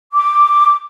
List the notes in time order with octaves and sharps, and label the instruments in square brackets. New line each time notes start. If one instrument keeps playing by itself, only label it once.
[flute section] D6